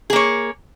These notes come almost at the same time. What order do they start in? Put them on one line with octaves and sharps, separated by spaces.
G#4 A#3 C#5